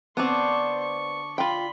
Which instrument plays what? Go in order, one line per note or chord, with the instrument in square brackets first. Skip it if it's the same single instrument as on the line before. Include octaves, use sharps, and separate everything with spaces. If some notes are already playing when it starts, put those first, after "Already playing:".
[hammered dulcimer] D3 D5 D6 [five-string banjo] B3 C4 [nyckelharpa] C5 C#6
[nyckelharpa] C#6
[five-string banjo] F4 G5 [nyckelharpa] B5 C6